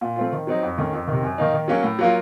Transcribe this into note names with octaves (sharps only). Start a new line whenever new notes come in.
A#2
A3 C4 F4
D#3
F#3 C4 D#4
F2
D#3 A3 C#4
F2
C3 D#3
F#2
D#3 A#3 D#4
D#3
F#3 A#3 C#4
A2
F#3 A#3 F4